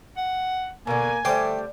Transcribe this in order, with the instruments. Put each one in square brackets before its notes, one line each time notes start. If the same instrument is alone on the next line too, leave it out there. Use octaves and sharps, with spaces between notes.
[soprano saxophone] F#5
[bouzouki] B2 D3 [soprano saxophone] A#3 [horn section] G#5
[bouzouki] D3 F#3 G3 [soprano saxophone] A3 [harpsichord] C5 G5 D6